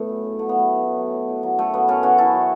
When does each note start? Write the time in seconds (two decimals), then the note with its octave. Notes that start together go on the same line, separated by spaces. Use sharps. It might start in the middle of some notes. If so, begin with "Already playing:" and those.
Already playing: A2 A3 B3
0.09 F#2
0.24 C#3
0.39 F#3 A3
0.49 B3
0.54 F#3 A3
0.69 F#3
0.83 A2
0.99 F#3
1.14 F#3
1.28 B2
1.43 F#3
1.58 F#2 A3
1.74 F#2 B3
1.88 F#2 A3 C#4
2.03 E3 C#4 F#4
2.18 F#2 E4 A4
2.33 F#3